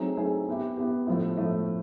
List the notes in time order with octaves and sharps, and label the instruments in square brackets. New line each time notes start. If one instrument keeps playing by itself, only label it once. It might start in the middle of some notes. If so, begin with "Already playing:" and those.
Already playing: [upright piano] F#3 A3 C4 D#4 G#4
F#3 A3 C4 D#4 G#4
B3 E4 G4
B3 E4 G4
A2 F3 A3
A2 F3 A3